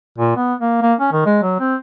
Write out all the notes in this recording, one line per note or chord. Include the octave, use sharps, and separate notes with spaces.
A#2
B3
A#3
A#3
C#4
D#3
G#3
F#3
C4